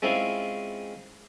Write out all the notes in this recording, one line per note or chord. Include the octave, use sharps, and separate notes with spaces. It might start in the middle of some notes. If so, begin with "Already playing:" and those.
G#3 C4 C#4 E4 F4 G#4